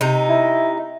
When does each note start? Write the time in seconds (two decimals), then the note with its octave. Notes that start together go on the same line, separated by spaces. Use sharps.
0.01 C3 D#4
0.29 E4